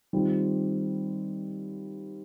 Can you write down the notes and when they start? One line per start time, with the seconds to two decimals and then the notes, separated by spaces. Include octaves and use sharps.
0.13 D#3 G3 C4 F4